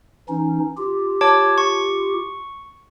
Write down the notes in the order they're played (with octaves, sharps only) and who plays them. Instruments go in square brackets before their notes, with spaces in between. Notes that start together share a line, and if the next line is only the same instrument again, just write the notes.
[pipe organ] E3 C#4 D#4
F4 G4
[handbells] C#5 A5 D6
C#6